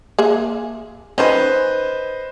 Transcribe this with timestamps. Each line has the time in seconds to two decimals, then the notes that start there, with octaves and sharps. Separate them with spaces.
0.19 A#3 G#4 E5
1.18 D#3 C#4 B4 C5 D#5